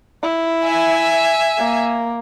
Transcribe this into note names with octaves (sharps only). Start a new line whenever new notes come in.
E4
E5 G#5
A#3